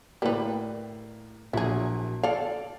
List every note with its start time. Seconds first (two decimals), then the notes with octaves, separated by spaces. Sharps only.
0.22 A2 G3 A#3 B4
1.53 A#1 F#3 E4 G#4
2.23 A4 D5 F5